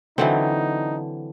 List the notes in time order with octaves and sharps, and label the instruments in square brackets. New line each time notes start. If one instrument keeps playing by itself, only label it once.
[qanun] D3 [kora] E3 F#3 C4 [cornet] D#4